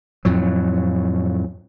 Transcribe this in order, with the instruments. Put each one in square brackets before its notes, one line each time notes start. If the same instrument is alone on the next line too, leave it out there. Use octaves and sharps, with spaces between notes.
[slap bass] F2 A2 F#3